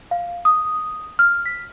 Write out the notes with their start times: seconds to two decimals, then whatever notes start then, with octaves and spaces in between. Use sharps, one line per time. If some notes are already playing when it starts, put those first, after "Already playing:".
0.11 F5
0.45 D#6
1.19 F6
1.46 B6